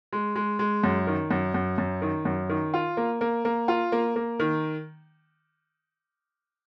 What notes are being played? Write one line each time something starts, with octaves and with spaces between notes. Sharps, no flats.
G#3
G#3
G#3
F#2
D#3
F#2
F#2
F#2
D#3
F#2
D#3
F4
A#3
A#3
A#3
F4
A#3
A#3
D#3